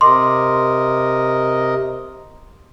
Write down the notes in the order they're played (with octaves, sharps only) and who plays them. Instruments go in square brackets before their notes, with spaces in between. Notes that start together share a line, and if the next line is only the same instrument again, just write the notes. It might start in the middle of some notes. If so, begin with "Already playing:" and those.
[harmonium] C3 A#4 D#5 [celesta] C6 D6